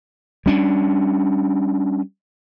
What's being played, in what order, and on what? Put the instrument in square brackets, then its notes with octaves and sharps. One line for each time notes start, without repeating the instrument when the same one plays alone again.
[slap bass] G3 C#4 D4